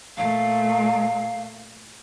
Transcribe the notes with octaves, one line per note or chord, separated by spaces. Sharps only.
A#2 A3 F5